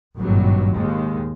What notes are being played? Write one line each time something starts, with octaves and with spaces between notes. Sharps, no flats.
G#1 G2 A#2 F#3
D#2 G#3